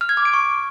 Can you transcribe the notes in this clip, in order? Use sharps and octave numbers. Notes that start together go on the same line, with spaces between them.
F6
G#6
D6
D7
C#6